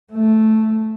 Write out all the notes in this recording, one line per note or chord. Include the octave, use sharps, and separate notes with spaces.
A3